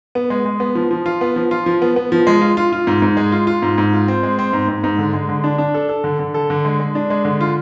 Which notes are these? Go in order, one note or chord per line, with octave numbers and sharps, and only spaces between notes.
B3
G#3
G#3
B3
F3
F3
F4
B3
F3
F4
F3
B3
B3
F3
G#3
F4
F4
F4
G#2
G#2
G#3
F4
F4
G#2
G#2
F4
C4
G#3
C4
G#2
G#2
G#2
D3
G#3
D3
D4
D4
A4
A4
D3
D3
A4
D3
G#3
G#3
D4
G#3
D3
F4